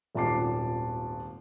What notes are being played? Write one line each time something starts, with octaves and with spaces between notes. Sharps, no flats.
D#1 G#1 A#2 A5 D6 C7